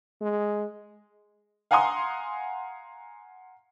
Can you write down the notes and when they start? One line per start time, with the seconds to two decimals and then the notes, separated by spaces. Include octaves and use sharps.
0.21 G#3
1.71 F5 F#5 G#5 A#5 C6 D#6